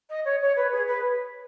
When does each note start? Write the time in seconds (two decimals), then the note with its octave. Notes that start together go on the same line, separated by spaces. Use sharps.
0.09 D#5
0.25 C#5
0.41 C#5
0.56 B4
0.72 G#4
0.87 B4